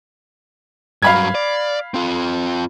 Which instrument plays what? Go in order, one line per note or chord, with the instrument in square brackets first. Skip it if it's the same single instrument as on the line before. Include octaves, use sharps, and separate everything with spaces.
[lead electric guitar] G2 F#3 [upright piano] F5 B5 G#6
[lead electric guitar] D5
C4 F4